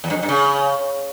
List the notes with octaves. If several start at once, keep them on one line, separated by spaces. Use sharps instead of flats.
E2
G2
F2
G2
C#3